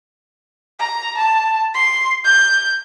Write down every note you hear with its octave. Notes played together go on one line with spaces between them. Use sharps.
A#5
A5
C6
G6